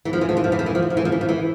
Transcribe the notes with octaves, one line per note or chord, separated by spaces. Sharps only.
E3
F3
E3
F3
E3
F3
E3
F3
E3
F3
E3
F3
E3
F3
E3
F3
E3